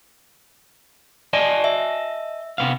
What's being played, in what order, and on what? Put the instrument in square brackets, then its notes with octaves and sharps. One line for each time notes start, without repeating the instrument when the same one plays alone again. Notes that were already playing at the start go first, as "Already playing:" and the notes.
[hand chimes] D5 [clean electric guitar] D#5 G#5 A5
[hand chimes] E5
[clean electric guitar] C3 B3 F5